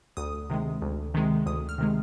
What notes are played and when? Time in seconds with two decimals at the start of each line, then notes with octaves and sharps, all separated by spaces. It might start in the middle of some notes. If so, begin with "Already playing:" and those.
0.17 D2 D#6
0.50 C3 D#3 G#3
0.82 D2
1.14 C3 D#3 G#3
1.46 D2 D#6
1.69 F6
1.78 C3 D#3 G#3